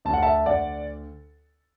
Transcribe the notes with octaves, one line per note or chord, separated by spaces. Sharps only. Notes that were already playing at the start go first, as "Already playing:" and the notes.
D2 A5
F#5
E5 A5
D2 D5 F#5